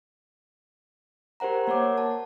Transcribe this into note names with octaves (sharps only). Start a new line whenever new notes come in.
G4 A#4 C5 F#5 A#5
A#3 C#5 F#5 D6
A5